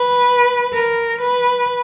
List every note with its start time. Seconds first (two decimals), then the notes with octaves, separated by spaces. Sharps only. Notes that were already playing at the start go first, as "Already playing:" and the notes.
Already playing: B4
0.73 A#4
1.21 B4